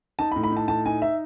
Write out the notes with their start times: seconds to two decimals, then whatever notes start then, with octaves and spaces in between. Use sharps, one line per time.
0.19 D#4 A5
0.32 B5
0.36 A2
0.43 B5
0.52 D#4
0.57 A5
0.68 A2 A5
0.86 D#4 G#5
1.02 D#4 E5